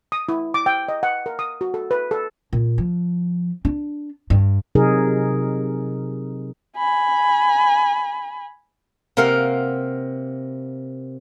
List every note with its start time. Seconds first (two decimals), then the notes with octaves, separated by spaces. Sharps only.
0.12 D#6
0.29 E4
0.54 D6
0.66 G5
0.88 D#5
1.03 F#5
1.26 A#4
1.39 D#6
1.61 F#4
1.74 A4
1.91 B4
2.11 A4
2.53 A#2
2.78 F3
3.65 D4
4.30 G2
4.75 C3 F#3 D#4 G#4 A#4
6.77 G#5 B5
9.17 C3 A#3 A#4 F5 F#5